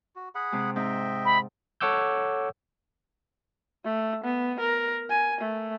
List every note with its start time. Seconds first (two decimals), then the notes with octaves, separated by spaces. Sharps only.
0.16 F#4
0.35 G#4 F#5 B5
0.52 C3 G#3
0.76 G#2 C4 D#4 D#5 E5 G5
1.25 B5
1.81 A4 C#5 F#5 D6 E6 G6
3.84 A3
4.24 B3
4.60 A#4
5.10 G#5
5.41 A3